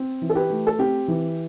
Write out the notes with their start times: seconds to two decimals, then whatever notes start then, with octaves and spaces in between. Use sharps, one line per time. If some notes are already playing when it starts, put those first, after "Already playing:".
Already playing: C4
0.22 E3
0.30 A4
0.35 G4 B4
0.50 A3
0.67 A4
0.79 C4 G4
1.08 E3